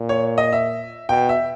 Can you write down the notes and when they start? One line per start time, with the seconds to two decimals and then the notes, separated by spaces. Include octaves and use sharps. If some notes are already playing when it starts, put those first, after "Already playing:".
Already playing: A#2
0.09 C#5
0.38 D#5
0.53 E5
1.09 B2 G5
1.29 E5